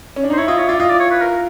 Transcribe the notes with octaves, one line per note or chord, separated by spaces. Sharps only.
C#4
D4
D#4
C5
E4 C#5
F4 D#5
E4 C#5
F4 D5
F4 D#5
D5
C#5
B4
A#4